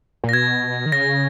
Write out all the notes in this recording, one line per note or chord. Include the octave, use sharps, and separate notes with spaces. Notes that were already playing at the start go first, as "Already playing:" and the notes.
A#2
A#6
B2 G#6
D#3
C#3 A#6